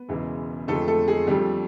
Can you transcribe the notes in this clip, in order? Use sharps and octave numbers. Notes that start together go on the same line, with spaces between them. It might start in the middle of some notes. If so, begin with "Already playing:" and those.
Already playing: B3
E1 E2 C#3 E3 G#3
F1 F2 D3 F3 G#3 A3 A4
A3 A4
G#3 G#4
F2 D3 F3 G3 A3 G4